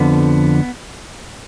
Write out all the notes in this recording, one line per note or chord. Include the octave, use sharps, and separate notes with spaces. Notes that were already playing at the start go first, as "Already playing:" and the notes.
Already playing: F2 D3 F3 B3